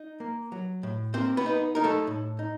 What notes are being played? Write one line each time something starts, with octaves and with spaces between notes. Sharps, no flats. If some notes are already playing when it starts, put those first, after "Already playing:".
Already playing: D#4
A#3
F#3
A2
A#3 C4 C5
B3 B4
D#4
D#4 A#4
A3 A4
A2
D#4